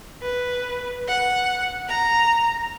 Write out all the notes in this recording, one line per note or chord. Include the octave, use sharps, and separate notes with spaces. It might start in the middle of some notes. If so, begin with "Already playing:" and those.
B4
F#5
A#5